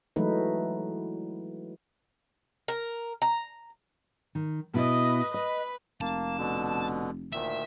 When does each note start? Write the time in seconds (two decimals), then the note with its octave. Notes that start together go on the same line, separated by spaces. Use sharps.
0.16 E3 F#3 G#3 A3 D#4 B4
2.68 A#4
3.22 A#5
4.35 D#3
4.74 B2 E4 B4 D#5
5.34 B4 D#5
6.01 F1 A#3 A5
6.38 B2 D3
7.33 D2 A#2 D#3 E5